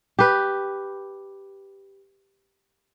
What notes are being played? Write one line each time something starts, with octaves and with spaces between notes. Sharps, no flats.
G4 B4